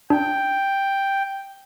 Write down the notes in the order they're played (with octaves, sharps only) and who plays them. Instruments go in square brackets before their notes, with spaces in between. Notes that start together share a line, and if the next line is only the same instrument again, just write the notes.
[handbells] D4 [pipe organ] G5